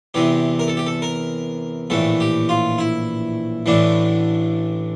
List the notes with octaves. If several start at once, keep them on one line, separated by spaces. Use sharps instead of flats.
E2 C3 E3 G4
A#4
A4
G4
A4
A#4
A#1 A2 E3 A4
G4
F4
E4
A1 A2 E3 D4